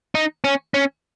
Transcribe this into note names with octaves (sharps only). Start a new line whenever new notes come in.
D#4
C#4
C#4